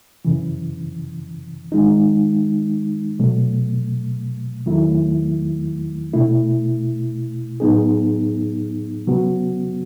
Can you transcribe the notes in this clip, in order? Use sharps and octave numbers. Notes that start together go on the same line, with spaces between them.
F#2 C#3 E3
D#3 G#3 D#4
B2 F#3 A3
E2 D#3 F#3 A3 E4
B2 A3 E4
A2 F#3 B3 D#4 G#4
C#3 F#3 B3 F#4